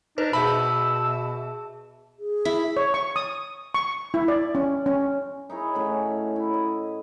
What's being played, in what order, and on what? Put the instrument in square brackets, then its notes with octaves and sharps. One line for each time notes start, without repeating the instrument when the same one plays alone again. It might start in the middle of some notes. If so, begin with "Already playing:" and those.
[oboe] D4 [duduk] D#4 [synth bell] B4 C5
[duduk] B2 [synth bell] G#4 E5 A5 [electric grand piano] B5 [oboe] E6
[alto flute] G#4
[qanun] E4
[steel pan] C#5
C#6
D#6
C#6
E4
D5
C#4
C#4
[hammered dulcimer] D#4 E4 G#4 C#5
A2 C#4 F#4 B5
E4
D#5